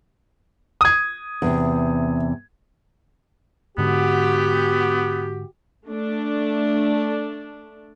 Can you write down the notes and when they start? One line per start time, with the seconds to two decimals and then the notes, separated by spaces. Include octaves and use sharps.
0.81 D#6 G#6
1.42 E2 C3
3.78 G#2 D3 B3 F#4 G4
5.86 A3 D4